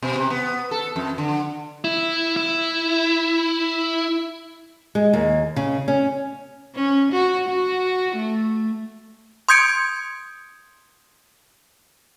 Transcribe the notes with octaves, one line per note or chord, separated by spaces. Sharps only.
B2
C3
B3
A4
F2
D3
E4
E4
G#3
D#2
C#3
C#4
C#4
F#4
F#4
A3
C6 D#6 G6 G#6 C#7 D7